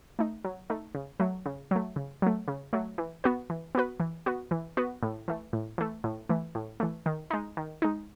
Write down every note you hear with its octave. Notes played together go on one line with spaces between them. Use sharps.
A3 D#4
F#3
A3 D#4
C#3
F#3 A3
C#3
F#3 A3
C#3
F#3 A3
C#3
F#3 A3
E3
B3 F#4 B4
E3
B3 F#4 B4
E3
B3 F#4 B4
E3
B3 F#4 B4
A2
E3 A3
A2
E3 A3
A2
E3 A3
A2
E3 A3
D#3
G#3 D#4
D#3
G#3 D#4